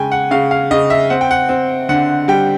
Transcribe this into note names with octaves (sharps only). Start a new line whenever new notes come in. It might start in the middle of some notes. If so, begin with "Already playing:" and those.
Already playing: C#3 G#3 G5 G#5
F#5
C#3 F5
F5
C#3 D#5
E5
C4 F#5
G5
F#5
C4
D3 F#5
G3 G5